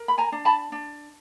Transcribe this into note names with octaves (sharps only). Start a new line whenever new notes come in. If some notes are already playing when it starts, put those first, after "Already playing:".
Already playing: A#4
B5
G#5 A#5
D4
A5 B5
D4